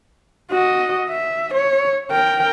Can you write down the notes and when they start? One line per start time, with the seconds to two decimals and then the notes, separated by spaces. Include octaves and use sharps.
0.51 F#4 D#5
1.08 E5
1.54 C#5
2.11 A#4 G5